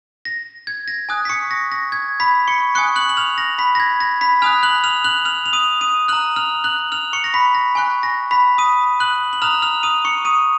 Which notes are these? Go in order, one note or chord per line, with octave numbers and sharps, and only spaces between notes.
A#6
G#6
A#6
G#5 D#6 F#6
B6
C#6 C#7
A#6
A#6
G#6
B5 B6
C#6 C#7
G#5 C#6 D#6 F#6 C#7
F#6 F#7
F#7
F6 F7
A#6
B5 B6
A#6
G#6
A#6
B5 B6
G#5 D#6 F6 F#6 F7
F#6 F#7
F6 F7
F#6 F#7
F6 F7
F7
D#6 D#7
D#6 D#7
A#5 F6 F#6 F#7
F6 F7
F#6 F#7
F6 F7
C#6 C#7
A#6
B5 B6
A#6
G#5 C#6 F#6
A#6
B5 B6
D#6 D#7
F#6 F#7
F#7
A#5 D#6 F6 F#6 F7
F6 F7
D#6 D#7
C#6 C#7
D#6 D#7